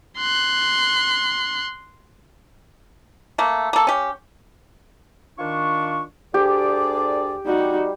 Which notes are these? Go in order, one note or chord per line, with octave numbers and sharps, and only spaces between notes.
C6 F#6
A3 A#3
A#3 A4
C#4 G4
D#3 D4 F4 C#6
D2 D4 G4 G#4 D5
G3 D#4 F#4